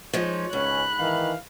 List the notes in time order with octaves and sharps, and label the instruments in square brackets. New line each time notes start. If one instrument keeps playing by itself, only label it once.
[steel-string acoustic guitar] F3 G#3 D#4 [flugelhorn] C#5
[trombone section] C#2 C#4 [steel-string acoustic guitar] G#2 [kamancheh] B5 F#6
[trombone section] D#3 E3 [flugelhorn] F5